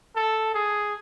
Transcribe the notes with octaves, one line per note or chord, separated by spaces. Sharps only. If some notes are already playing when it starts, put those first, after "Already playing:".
A4
G#4